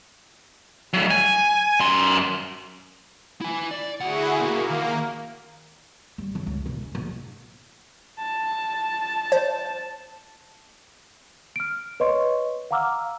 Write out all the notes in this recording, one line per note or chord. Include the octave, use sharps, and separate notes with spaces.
A2 F#3
G#5
F#2 C6
E4 G#5
D5
D2 E4 F#4 G#4 F#5
A#2 A#3 F#4
D#2
G2
F#2
C#2
E1
C#4
A#1
A5
C5
F6 D7
B4 C#5 D#5 C6 C#6
F5 F#5 A#5 D6 E6 F6